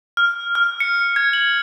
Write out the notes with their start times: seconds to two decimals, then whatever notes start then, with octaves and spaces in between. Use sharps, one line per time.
0.17 F6
0.55 F6
0.80 C#7
1.16 G#6
1.33 F#7